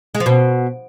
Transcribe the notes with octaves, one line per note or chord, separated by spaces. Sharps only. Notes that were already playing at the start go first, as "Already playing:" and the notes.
G#3
F3
B2